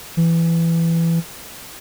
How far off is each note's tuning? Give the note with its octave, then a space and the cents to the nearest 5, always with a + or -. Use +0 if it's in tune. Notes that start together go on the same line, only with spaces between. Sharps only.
E3 +15